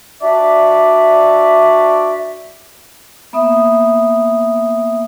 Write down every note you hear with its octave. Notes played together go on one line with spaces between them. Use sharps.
D4 F#4 D5 E5
A#3 B3 E5 D#6